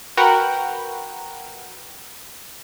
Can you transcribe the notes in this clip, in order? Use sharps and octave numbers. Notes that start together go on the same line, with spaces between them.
F#4 A#4 B4 F#5 G5